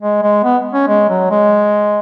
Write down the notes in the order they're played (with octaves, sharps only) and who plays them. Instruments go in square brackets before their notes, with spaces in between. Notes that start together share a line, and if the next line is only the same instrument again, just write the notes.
[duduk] G#3
G#3
B3
C#4
G#3
F#3
G#3